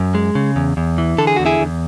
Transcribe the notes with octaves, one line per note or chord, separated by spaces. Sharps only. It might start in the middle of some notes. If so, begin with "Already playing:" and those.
Already playing: F#2
G#3
C#3
E2
E2
E3
D3 A4
G#4
E2 F#4
E4 G#4
E2